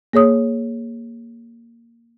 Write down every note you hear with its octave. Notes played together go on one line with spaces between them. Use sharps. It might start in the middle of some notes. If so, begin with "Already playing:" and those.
A#3 G#4 C#5 D#6